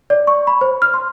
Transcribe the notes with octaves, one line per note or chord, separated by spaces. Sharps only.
D5
C#6
B5
C5
F6
C6